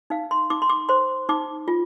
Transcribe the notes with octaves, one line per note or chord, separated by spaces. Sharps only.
D#4 F5
C6
D#4 D6
C6
D6
C5 C6
D#4 D6
F4